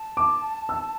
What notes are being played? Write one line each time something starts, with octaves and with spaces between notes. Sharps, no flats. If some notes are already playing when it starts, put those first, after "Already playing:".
Already playing: A5
D6
E6